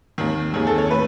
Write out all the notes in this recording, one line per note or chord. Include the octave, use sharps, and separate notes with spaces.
D#2 D#3
D#2 D#3 G#4
A4
C#5
A2 B4